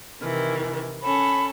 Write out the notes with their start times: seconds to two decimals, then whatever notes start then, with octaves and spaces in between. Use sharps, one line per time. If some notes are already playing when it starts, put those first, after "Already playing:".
0.21 C3 D#3 E3
1.02 C#4 A4 B5